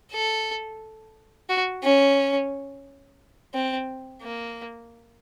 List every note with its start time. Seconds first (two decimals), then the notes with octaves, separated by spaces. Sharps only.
0.12 A4
1.49 F#4
1.83 C#4
3.54 C4
4.22 A#3